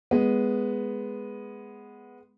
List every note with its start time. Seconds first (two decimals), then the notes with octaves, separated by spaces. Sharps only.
0.11 G#3 B3